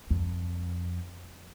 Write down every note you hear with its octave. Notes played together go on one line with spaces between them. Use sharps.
F2